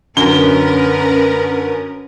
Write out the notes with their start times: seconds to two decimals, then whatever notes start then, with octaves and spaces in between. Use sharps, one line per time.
0.17 F#2 D3 C#4 A#4 B4 G7